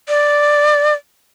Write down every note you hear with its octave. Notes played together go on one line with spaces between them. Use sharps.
D5